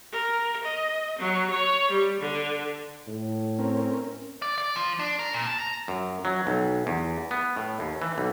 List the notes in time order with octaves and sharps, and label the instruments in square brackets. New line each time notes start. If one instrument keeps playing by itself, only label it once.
[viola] A#4
D#5
F#3
C#5
G3
D3
[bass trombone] A2
[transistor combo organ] C4 C#4 A#4
[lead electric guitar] D5
D5
F3
D4
A#4
A#2
A5
A#5
[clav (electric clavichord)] F#2
F#3
B1
E2
B3
A2
D#2
E3
B1